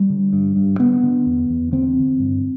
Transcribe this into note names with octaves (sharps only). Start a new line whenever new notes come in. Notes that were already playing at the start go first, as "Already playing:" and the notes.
Already playing: G3
D3
G2
G2
D3 B3
D3
E2
E2
D3 C4
D3
G2